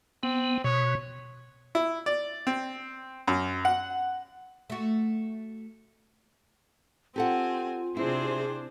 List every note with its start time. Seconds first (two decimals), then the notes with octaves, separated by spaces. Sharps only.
0.23 B3 C4
0.64 B2 C#5
1.75 E4
2.06 D5
2.47 C4
3.28 F#2
3.65 F#5
4.70 A3 F#4
7.16 C4 F4 G4 A4 F#5 G#5
7.97 C3 C4 D4 E4 G#4 C5